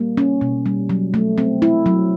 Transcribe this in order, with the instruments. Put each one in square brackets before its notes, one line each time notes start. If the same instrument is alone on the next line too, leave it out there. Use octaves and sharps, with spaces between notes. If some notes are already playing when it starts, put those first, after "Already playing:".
Already playing: [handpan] G3 A#3
C#4
B2
G3
F#3
A3
C4
E4
F#3